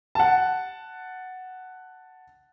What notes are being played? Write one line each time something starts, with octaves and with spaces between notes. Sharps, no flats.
F#5 A5